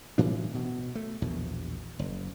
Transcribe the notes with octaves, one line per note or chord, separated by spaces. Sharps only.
A2 E3 D4
B2
A3
A#1 E2 B2
F#1